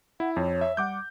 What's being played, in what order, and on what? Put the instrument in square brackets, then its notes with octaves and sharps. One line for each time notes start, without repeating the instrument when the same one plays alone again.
[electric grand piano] E4 [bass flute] F#5
[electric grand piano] F2 [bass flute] C#5
[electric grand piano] E5
[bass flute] G3 [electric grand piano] F#5 D6 G6